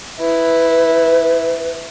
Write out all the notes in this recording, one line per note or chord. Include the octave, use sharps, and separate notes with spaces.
E4 B4